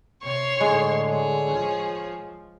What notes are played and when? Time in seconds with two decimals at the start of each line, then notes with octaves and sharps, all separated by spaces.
0.24 C3 C#5 C6 C#6
0.60 A2 D3 G#3
1.07 G#4 C#5
1.52 F3